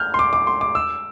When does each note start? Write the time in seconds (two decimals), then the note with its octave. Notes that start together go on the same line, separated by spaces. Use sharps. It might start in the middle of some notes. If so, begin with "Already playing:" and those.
Already playing: F6 G6
0.14 C6
0.19 D6
0.33 D6
0.47 C6
0.61 D6
0.75 E6